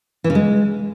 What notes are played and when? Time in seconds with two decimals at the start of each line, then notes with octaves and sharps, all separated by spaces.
0.24 E3
0.30 C#3
0.35 G#3